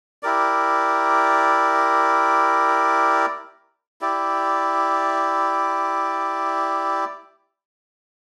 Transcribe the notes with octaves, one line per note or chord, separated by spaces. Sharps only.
E4 G4 A#4 D5
E4 G4 D5